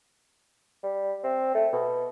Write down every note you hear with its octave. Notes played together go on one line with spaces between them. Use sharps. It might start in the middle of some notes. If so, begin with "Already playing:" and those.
G3
C4
A3
B2